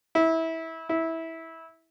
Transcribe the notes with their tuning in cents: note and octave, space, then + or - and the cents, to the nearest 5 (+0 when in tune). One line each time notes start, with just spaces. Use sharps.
E4 -20
E4 -15